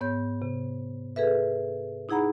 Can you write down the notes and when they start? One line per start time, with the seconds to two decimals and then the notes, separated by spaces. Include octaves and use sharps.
0.01 G#2 B3 C#5 G6
0.42 C3
1.16 G#4 A4 B4 E5
2.09 D#4 E4 G#4 F#5 A#5 B5